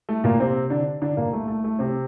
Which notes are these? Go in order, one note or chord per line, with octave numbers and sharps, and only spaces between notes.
A3
A#2 A#3
C3 C4
D3 D4
D3 D4
A#2 A#3
A3
A3
A3
C3 C4